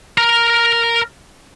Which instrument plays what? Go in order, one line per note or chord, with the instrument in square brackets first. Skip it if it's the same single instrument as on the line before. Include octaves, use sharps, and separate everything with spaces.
[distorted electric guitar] A#4 A#5